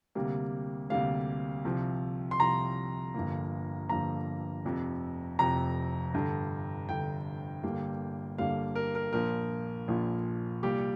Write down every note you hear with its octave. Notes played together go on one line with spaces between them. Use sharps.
D2 C3 G3 A#3
D2 C3 G3 A#3 F5
C2 C3 F3
C6
C2 C3 F3 A#5
G1 G2 F3 A#3
G1 G2 F3 A#3 A#5
F1 F2 C3
F1 F2 C3 A#5
G1 G2 D3
G1 G2 D3 G5
G1 G2 D3 G3 A#3
G1 G2 D3 G3 A#3 F5
A#4
A#4
A#1 A#2 F3 A#4
A#1 A#2 F3
C2 A#2 G3 A#3 G4